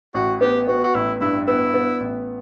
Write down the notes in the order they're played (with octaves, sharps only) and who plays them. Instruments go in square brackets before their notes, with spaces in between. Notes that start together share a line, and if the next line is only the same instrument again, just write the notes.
[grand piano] A1 [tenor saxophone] F#4
[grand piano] B3 [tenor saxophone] G4
[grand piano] B3 [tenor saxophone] F#4
[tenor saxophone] F#4
[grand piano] A1 [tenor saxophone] E4
[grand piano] G2 [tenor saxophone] E4
[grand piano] B3 [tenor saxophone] E4
[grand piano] B3
A1